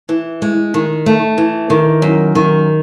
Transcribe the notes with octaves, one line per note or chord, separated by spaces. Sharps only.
E3
G#3
D#3
A3
E3
D#3
F#2
D#3